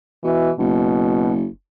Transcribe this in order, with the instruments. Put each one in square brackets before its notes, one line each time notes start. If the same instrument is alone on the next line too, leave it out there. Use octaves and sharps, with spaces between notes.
[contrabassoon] B2 [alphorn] E3
[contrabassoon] F#1 [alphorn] B2